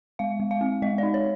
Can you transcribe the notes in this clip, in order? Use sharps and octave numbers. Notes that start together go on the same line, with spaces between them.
G#3 F5
G#3
F5
C4
G#3 D#5
D#4 D5
C#5